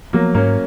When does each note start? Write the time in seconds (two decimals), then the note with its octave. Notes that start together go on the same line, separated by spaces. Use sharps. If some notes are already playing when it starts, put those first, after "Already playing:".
0.13 F3 F#3 A#3 B3
0.34 G#2 A#3 C#4